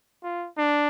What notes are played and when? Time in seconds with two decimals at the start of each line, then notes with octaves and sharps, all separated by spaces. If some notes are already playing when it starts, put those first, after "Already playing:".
0.23 F4
0.58 D4